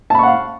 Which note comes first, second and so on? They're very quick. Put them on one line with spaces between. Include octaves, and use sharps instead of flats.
A5 B5 C#6 F#5 F5